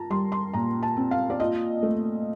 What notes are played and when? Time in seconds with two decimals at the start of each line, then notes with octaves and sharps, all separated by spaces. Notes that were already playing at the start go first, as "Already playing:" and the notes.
Already playing: F4 A5 A#5
0.10 G3 C6
0.32 C6
0.53 A#2 A#5
0.83 A5
0.97 C4
1.11 F5
1.30 D5
1.40 F4 D#5
1.83 A3